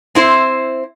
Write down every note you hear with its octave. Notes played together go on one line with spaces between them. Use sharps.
C4 E4 C5